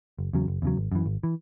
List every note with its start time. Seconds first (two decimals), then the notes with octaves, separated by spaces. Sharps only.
0.19 F#1
0.33 E2 C#3 F#3
0.48 F#1
0.62 E2 C#3 F#3
0.77 G#1
0.92 F#2 E3
1.06 G#1
1.23 E3